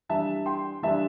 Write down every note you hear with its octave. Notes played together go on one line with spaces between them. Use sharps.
E3 G3 D4 E5 A5
G5 C6
E3 G3 D4 E5 A5